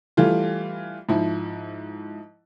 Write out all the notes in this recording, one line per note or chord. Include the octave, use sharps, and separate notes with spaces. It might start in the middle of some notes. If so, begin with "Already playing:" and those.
E3 G3 A3 F4
G#2 F3 E4